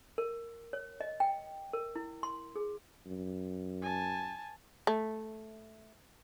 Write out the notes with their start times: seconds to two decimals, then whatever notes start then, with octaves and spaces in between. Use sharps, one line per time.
0.18 A#4
0.73 C#5
1.01 D#5
1.20 G5
1.73 A#4
1.95 E4
2.23 C6
2.56 G#4
3.06 F#2
3.82 G#5 A5
4.87 A3